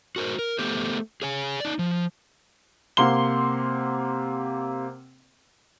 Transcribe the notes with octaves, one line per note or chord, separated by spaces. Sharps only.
F#4 A#4 C5
A#4
A3 B3 G4 C5
G#4 C#5 G#5
D#4 D5
F3
C3 A#3 F#5 C6 G7